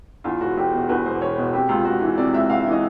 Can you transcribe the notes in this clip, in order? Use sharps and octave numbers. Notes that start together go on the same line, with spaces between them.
E2 F4
E1 F#4
E1 G4
B2
E2 B4
E1 C5
E1 C#5
B2
C3 G4
C#2 F4
C#2 F#4
E3
C3 D5
C#2 E5
C#2 F5
E5
E3
D#5